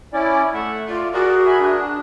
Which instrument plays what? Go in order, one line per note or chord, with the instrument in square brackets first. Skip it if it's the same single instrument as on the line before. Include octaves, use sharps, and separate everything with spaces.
[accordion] C#4 E4 D5
[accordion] A3 [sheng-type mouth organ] E5 F#5
[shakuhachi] F4 [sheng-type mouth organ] D5
[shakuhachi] F#4 [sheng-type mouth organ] G#4 A#4 [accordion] D5
[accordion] E5 G#5 B5
D4